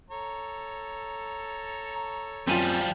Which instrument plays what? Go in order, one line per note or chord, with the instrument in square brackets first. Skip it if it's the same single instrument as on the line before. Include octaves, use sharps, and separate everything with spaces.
[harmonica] A4 C#5 A#5
[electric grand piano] F#2 F4 [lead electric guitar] F3 G3 [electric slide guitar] C4 G#5